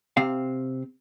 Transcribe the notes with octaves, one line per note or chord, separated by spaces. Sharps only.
C3 C4 F5